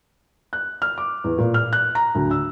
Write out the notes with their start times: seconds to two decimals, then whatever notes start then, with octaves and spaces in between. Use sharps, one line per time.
0.53 F#6
0.82 F6
0.98 D6
1.24 E2
1.38 A#2
1.54 F6
1.73 F#6
1.95 A#5
2.15 D2
2.31 E6